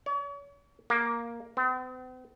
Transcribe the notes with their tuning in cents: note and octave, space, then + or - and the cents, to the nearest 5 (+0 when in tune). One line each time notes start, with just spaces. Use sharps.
C#5 +40
A#3 +5
C4 -45